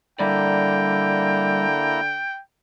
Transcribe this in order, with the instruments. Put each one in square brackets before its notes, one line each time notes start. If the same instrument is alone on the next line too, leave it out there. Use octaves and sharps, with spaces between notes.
[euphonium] D3 [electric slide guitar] G3 D5 [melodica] A#3 E4 A#5 [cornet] G5